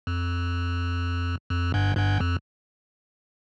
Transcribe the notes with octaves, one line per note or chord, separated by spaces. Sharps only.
F2
F2
G1 G2
G1 G2
F2